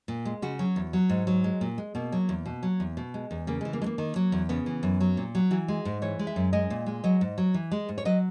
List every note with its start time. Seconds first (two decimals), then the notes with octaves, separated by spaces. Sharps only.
0.08 A#2
0.25 G#3
0.42 C#3 F#4
0.59 F#3
0.76 E2
0.93 F#3
1.09 G#2
1.27 F#3
1.44 G#3
1.61 A#2
1.78 G#3
1.95 B2 A#3
2.12 F#3
2.29 E2
2.46 B2
2.63 F#3
2.80 E2
2.97 B2
3.14 G#3
3.31 E2
3.47 C#3 A#3
3.61 G#3
3.65 E3
3.73 A#3
3.82 G#3
3.86 A#3
3.98 D#3
4.16 F#3
4.32 E2
4.49 C#3 B3
4.66 E3
4.83 F#2
5.00 F#3
5.17 A#2
5.35 F#3
5.51 E3 F#4
5.68 G#3
5.85 G#2
6.02 E3 C#5
6.19 G#3
6.27 E5
6.36 F#2
6.53 G#3 D#5
6.70 A#2
6.86 G#3
7.04 F#3 D#5
7.21 G#2
7.38 F#3
7.54 E3
7.72 G#3
7.89 G#2
7.98 C#5
8.05 F#3 D#5